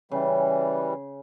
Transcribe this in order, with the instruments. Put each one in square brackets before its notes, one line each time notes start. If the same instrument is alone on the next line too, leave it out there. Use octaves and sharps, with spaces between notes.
[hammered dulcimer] C#3 [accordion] E3 G3